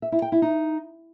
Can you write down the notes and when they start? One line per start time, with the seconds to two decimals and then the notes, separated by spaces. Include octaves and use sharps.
0.02 E5
0.12 E4
0.22 G5
0.32 E4
0.42 D#4